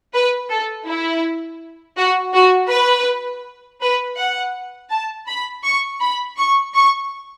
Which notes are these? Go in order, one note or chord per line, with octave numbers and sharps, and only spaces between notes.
B4
A4
E4
F#4
F#4
B4
B4
F#5
A5
B5
C#6
B5
C#6
C#6